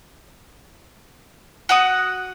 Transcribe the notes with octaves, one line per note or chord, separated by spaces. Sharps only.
F#4 F#5 D#6